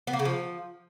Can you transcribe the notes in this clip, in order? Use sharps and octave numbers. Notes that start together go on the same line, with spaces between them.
B3
A#3
C#3
F3